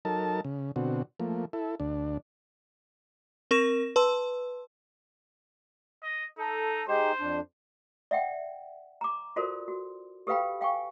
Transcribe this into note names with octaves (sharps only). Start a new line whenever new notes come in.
F#3 D#4 A4 A#4 A5
C#3
B2 D3 C4 F#4
F3 A3 A#3
E4 A4
D2 D4
C4 A#4 C#6 A#6 E7
B4 A5 C6 E6
D#5
D#4 A4
G#3 D#4 G4 C5
F2 D4
D5 E5 F#5 G5
A#5 D6
F4 F#4 A4 A#4 C5 D5
F#4
G4 A4 B4 F5 G5 B5
F5 G5 G#5 C#6